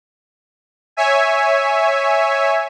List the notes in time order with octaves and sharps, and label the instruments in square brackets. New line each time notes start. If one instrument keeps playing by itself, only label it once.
[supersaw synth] C#5 E5 G#5